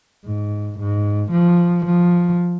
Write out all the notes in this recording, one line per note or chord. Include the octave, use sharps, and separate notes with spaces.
G#2
G#2
F3
F3